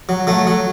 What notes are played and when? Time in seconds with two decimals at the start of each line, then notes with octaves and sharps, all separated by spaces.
0.09 F#3
0.27 F#3 A3
0.47 F#3